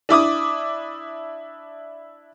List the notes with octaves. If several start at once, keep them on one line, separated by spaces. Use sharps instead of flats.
D4 E4 D6 D#6